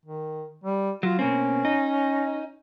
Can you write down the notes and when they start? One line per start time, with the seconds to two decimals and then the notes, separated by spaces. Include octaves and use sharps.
0.05 D#3
0.64 G3
1.03 F#3 F4
1.19 B2 A#3 C4 C#4
1.65 D#4